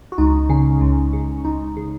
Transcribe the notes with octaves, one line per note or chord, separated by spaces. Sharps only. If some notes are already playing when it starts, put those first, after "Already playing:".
F#4
C#2 D#4
C#3 C#4
C#2
C#3
C#2 D#4
C#3